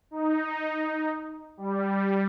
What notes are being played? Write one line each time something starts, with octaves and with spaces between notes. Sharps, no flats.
D#4
G3